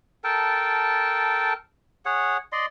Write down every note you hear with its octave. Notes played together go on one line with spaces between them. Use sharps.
A4 A#4 G5 A5
G#4 C#5 F#5
D5 D#5 C6